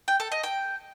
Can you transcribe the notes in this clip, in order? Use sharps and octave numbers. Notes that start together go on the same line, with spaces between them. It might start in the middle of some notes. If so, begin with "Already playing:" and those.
G5
A4
D#5
G5